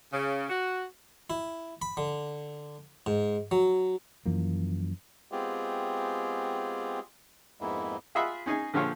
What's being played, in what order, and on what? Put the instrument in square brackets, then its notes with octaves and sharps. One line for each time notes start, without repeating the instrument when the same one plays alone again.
[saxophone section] C#3
F#4
[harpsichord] E4
B5
D3
G#2
F#3
[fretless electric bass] F#2 E3 F3 A#3
[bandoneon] G#3 B3 C4 F4 G4 G#4
F2 G#2 G#3 A#3 B3 E4
[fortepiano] F4 G#4 D#5 E5 F#5 B5
C#4 D#4 G#4 G#5
A#2 D3 F3 G4 C#5 F5